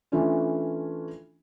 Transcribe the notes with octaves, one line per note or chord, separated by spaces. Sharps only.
E3 A3 C#4 D4 F4